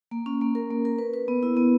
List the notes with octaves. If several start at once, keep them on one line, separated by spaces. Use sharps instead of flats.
A#3
C#4
A#3
A#4
A#3
A#4
B4
B4
B3
E4
B3